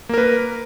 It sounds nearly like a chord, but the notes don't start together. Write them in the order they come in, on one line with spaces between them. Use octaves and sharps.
A#3 A#4 B4